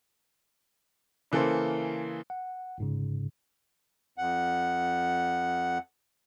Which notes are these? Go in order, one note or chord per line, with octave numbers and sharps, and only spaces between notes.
C#3 E3 A#3 A4 C5
F#5
G1 G#2 C#3
F2 F#5